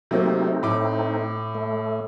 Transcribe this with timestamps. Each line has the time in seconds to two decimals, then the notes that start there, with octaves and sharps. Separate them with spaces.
0.11 C3 F#3 A3 A#3 C4 D#4
0.63 A2 D6
1.55 A3